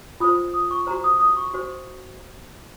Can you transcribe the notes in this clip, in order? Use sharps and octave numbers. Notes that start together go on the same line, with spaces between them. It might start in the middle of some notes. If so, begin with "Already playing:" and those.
F4 C5 D#6
D#6
C#6
F#4 C5 A#5
D#6
D#6
C#6
F#4 C5